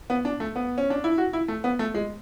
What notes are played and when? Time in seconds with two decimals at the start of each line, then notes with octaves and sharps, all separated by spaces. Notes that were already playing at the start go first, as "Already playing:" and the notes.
0.10 B3
0.25 D4
0.40 A3
0.56 B3
0.78 C#4
0.90 D4
1.04 E4
1.18 F#4
1.33 E4
1.48 A3
1.64 B3
1.79 A3
1.94 G#3